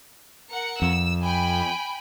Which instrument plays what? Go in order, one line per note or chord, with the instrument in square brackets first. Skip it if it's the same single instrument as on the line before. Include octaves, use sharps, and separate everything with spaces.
[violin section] A#4 F#5 C#7
[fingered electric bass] F2 [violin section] E6
[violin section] G5 G#5 B5